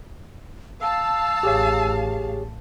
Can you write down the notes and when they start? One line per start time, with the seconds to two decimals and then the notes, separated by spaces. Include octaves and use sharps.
0.81 F5 A5 E6
1.43 A1 G4 G#4 C#5